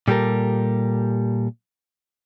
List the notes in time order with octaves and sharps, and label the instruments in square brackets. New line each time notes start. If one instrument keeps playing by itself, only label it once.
[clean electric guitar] A#2 G3 G4 A4 A#4